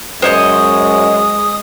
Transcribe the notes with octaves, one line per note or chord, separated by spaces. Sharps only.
F#2 G#3 C5 C#5 D#5 D#6